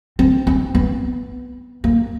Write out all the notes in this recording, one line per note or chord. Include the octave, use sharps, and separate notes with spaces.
C4
C4
B3
A#3